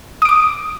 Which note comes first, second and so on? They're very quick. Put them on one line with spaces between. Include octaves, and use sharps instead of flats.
D#6 D7 D6